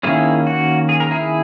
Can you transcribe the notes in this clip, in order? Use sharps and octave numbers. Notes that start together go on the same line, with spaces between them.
D#3 A#3 C#4 E4 G#4
F#4
G#4
A#4
E4 G#4